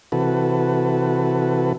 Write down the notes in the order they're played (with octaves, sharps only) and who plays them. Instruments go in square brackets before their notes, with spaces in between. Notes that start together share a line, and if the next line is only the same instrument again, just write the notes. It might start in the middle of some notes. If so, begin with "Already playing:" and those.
[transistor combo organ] C3 E3 F#4 A4 B4